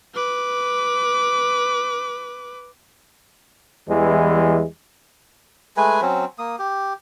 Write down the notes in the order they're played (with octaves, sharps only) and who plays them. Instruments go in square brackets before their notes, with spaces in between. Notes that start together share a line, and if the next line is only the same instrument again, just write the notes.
[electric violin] B4 D6
[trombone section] E2 E3 G3 G#3
[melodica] G#3 A3 B4 G#5
F#3 C4 C#4
A#3 D#6
G4